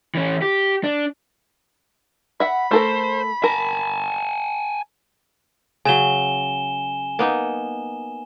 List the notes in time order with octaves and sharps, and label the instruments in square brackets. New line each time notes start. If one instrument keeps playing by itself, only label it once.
[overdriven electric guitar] E3 C#4
G4
D4
[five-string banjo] E5 F#5 [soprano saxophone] B5
[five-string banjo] A3 A4 A#4 [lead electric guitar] C5
[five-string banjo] A#4 [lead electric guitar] G#5 A5
[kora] C#3 F#3 [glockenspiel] G#5 E7 G7
[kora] A#3 B3 D#4